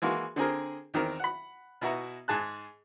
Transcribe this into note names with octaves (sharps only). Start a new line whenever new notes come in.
E3 G#3 A#3 F#4
D3 C4 G#4 A#4
E2 D#3 C4 A#4
F#5 B5
B2 B3 E4 F#4 A#5
G#2 G#4 A5 F#6